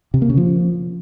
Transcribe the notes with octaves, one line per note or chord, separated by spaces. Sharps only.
C3
A#3
C#3
F3